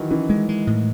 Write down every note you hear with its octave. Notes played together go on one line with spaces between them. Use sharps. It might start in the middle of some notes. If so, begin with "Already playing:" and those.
Already playing: D#3 E3 F#3
E3 C#4
G#3
G#3
A2